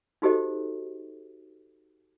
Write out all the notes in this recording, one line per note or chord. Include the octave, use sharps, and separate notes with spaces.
D#4 F#4 G4 A4 C5 D#5